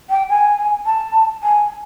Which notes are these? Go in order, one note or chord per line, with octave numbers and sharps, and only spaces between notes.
G5
G#5
A5
G#5